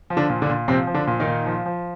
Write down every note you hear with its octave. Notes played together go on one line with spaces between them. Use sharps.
F3
D3 D4
A#2
D3 D4
A#2
C3 F3 C4
F3
D3 D4
A#2
D#3 D#4
A#2
F3
F3